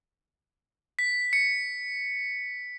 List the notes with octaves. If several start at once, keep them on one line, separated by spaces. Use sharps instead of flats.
B6
C#7